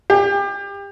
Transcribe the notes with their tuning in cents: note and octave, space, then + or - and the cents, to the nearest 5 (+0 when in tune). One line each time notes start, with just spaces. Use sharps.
G4 +30